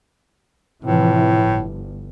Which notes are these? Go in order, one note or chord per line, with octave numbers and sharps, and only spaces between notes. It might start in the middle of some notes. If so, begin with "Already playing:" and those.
A2 C3 E3 F3
G1